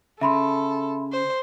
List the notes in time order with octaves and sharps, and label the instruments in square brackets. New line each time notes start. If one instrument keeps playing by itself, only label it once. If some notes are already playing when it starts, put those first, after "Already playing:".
[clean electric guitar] C#3 [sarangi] A4 [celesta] E5 B5 C6
[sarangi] C5